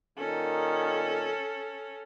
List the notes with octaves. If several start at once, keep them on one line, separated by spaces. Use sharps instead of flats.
A#2 D#3 C#4 A4